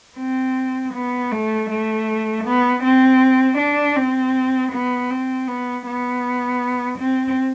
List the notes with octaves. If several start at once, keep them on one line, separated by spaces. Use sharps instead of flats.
C4
B3
A3
A3
B3
C4
D4
C4
B3
C4
B3
B3
C4